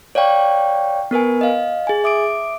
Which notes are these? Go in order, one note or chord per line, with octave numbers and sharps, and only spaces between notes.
C#5 D5 F5 G5 C#6
B3 A#4 B4 G#5
D#5 F5
G#4 G#5
E5 D6 D#6 D7